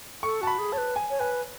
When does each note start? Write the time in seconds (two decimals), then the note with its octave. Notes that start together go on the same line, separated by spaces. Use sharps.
0.23 A4 C#6
0.41 F#4 A5
0.47 B5
0.59 G#4
0.72 C#5 A5
0.78 B4
0.96 G#5
1.10 C#5
1.20 B4 G#5